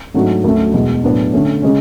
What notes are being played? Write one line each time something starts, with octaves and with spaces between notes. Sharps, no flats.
G#2 F#3 A3 D4 F#4
D2 D3 F#3 A3 C#4
E2 B2 G#3
A2 F#3 B3 D4
D3 A3 C#4
C#3 G#3 C#4